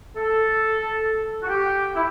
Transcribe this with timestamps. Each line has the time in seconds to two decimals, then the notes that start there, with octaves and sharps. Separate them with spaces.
0.16 A4
1.42 F#4
1.48 G4
1.95 E4